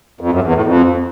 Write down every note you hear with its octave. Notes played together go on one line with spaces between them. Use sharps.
F2
F#2
E2
A2
F2